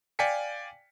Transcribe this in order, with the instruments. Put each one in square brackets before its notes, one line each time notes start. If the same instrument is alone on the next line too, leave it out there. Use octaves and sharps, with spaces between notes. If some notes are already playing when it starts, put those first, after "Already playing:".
[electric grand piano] D5 F5 G5 G#5 B6 C#7